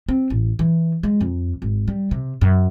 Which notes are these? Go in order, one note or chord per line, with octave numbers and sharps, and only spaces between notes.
C4
A1
E3
G#3
F2
G#1
G3
C3
F#2